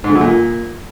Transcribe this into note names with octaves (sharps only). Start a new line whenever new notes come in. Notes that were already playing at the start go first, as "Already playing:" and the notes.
G#2
D3
F#2
A#2